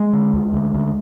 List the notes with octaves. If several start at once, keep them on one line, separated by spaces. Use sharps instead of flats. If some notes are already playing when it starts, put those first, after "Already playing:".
Already playing: G#3
D3
D2
D2
D2